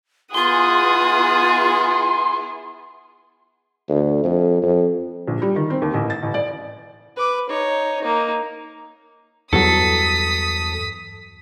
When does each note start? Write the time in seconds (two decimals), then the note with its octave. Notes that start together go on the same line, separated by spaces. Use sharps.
0.35 B3 E4 F4 G#4 F#5 C6 D#6
3.89 D2
4.24 F2
4.62 F2
5.28 A#1
5.42 G3
5.56 D#3
5.70 C4
5.82 D#2
5.94 A1
6.10 A6
6.23 A1
6.34 D5
7.16 B4 D6
7.49 D#4 C#5
8.01 A#3 D#4
9.53 E2 G2 F#3 A4 D#6 B6